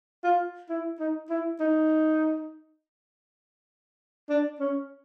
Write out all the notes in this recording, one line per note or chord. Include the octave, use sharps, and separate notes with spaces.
F4
E4
D#4
E4
D#4
D4
C#4